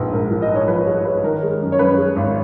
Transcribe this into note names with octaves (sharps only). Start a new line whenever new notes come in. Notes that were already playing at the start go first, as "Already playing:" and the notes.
Already playing: A#1 G#2 B4
G#2 A#4
F3
D#5
G#2
C#5
F3 B4
G#3 C#5
G#3 B4
D#3 A#4
G#3
F#2
C#5
F#2 B4
G#3
G#1